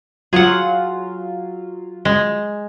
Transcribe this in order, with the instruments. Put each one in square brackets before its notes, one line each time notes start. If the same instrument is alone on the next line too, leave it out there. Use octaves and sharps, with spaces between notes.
[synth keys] F#3 F4 [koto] G#4 F#5
[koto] G#3